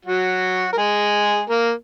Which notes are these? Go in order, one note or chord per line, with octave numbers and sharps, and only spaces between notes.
F#3 F#4
A#4
G#3 G#4
A#3 A#4